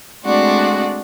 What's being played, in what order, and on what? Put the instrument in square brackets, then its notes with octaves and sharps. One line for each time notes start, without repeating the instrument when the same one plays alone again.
[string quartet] G#3 A3 C4 D4 F#4 D5